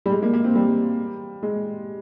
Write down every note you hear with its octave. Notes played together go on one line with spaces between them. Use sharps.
G3
G#3
A#3
A#3
C4
G3
G#3